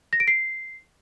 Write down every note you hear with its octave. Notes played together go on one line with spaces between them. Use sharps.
A#6
D7
C7